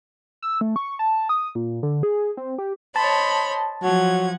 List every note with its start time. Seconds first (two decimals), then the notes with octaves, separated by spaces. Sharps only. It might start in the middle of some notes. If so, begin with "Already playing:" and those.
0.43 E6
0.61 A3
0.76 C#6
0.99 A5
1.29 D#6
1.55 A#2
1.83 D3
2.03 G#4
2.37 C4
2.58 G4
2.96 C5 C#5 D#5 A5 B5
3.83 F3 F#3 F#5 G#6